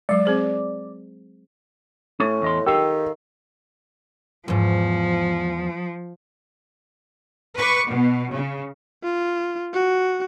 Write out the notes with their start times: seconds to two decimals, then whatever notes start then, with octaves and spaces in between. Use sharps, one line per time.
0.09 F#3 G#3 D5
0.25 C4 G#4 C5
2.20 A2 A3 C#4
2.42 E2 D#5 C6
2.66 D#3 G4 A4 F5
4.48 E2 G#2 F3
7.56 B4 C#6 D6
7.88 B2
8.32 C#3
9.03 F4
9.74 F#4